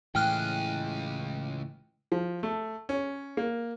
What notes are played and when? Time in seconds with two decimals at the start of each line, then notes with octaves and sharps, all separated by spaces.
0.15 C#2 A2 E3 G#4 G5 F6 F#6
2.12 F3
2.43 A3
2.89 C#4
3.37 A#3